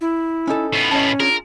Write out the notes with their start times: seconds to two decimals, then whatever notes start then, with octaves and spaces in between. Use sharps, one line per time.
0.01 E4
0.47 C#4 D#4 A4
0.73 A2 B3
0.91 C#4 D#5 A5
1.20 D4 F4 G#4 A#4